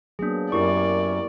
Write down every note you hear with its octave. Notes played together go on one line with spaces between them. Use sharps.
F#3 A#3 B3 D4 G#4
F#2 E4 G4 A#4 D5 C#6